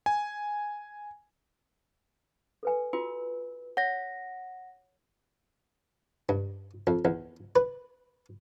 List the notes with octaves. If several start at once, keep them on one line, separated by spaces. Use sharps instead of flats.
G#5
A4 B4 G#5
F4 F#4 B4
C#5 F#5 A#6
G2
F2
E2
B4